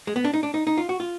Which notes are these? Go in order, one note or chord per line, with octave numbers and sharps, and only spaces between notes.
G#3
B3
D4
D#4
D4
D#4
D#4
F4
F#4
F4